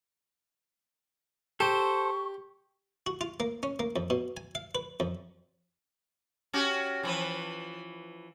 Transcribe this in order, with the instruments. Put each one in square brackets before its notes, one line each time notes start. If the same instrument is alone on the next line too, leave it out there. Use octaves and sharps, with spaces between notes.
[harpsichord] G4 [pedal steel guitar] A4 C5 [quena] C#6
[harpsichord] F#4
F4
A#3
C#4
A#3
F2
B2
G#5
F5
B4
F2
[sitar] C#4 F#4 G4
E3 F3 B4